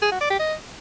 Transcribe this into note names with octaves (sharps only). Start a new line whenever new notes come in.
G#4
F#4
D5
G4
D#5